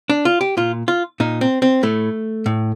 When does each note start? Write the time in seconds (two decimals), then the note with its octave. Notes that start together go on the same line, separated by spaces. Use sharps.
0.10 D4
0.25 F4
0.41 G4
0.57 A#2 F4
0.88 F4
1.20 A#2 D#4
1.41 C4
1.62 C4
1.83 A2 A3
2.46 A2